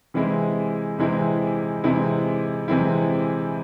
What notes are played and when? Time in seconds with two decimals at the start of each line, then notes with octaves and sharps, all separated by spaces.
0.14 C3 E3 G#3 C4 E4
0.99 C3 E3 G#3 C4 E4
1.84 C3 E3 G#3 C4 E4
2.68 C3 E3 G#3 C4 E4